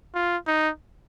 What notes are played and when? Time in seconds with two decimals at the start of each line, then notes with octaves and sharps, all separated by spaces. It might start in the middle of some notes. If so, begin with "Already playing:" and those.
0.15 F4
0.47 D#4